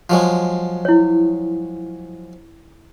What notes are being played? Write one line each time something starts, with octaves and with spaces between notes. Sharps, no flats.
F3 F#3 G#3
E4 C#5